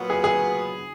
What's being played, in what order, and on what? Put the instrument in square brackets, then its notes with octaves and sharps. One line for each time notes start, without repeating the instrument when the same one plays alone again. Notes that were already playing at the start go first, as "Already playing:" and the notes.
Already playing: [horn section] A#2 F#3 B3
[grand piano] G#4
G#4